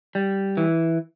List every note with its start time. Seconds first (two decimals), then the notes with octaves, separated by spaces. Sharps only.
0.15 G3
0.57 E3